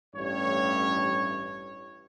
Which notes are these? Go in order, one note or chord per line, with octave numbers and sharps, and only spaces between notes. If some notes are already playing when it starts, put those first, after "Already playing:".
A1 G2 C#5